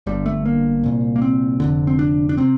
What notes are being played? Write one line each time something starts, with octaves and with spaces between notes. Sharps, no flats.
G1 G2 D3 G3
A3
A#3
C2 A#2
A#3
C4
F1 D#2 D3
C4
D4
D4
C3 C4